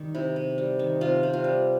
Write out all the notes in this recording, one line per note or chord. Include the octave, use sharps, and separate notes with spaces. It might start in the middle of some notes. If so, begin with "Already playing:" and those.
Already playing: D#3 G3
C3 E4
C3
G3
D#3
C3 F4
C3
F4
G3